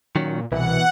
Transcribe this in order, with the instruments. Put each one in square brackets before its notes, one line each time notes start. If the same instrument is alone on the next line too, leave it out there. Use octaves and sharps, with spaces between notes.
[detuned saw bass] A#2 [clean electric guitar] D#3 F#3 C#4
[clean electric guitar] C2 [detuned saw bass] B2 [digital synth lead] E3 [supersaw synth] F#5